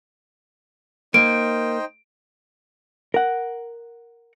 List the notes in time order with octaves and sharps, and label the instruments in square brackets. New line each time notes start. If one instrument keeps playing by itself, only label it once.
[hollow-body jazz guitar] A#3 [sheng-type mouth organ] D#4 C5 G5 [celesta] D7
[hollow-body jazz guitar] A#4 F#5